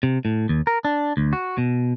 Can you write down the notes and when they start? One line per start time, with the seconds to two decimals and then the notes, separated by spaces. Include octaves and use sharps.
0.03 C3
0.25 A2
0.49 D#2
0.67 A#4
0.85 D4
1.17 D2
1.33 F#4
1.58 B2